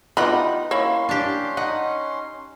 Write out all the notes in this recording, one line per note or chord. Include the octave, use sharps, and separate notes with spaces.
E3 B3 D#4 F4 G4 F#5 B5
A#3 C#4 E4 C#5 C6
D4 G4
D#4 F#5